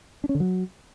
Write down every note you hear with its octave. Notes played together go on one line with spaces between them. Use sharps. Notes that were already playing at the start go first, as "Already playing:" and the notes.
D4
C#4
D3
F#3